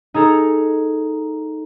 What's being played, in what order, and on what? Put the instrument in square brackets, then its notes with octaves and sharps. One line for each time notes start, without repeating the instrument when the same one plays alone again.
[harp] D#4 G#4 A4 A#5